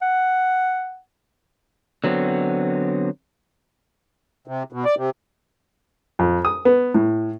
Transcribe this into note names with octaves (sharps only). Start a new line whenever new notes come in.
F#5
D3 F#3 B3 C4
C3
B2
D5
C3
F2
D#6
B3
A2